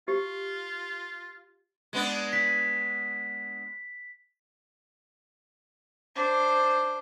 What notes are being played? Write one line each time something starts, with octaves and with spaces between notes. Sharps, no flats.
F4 G4
G#3 B3 D4
B6
D4 C5